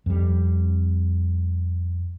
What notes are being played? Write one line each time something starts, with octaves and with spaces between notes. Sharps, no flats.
F2 G3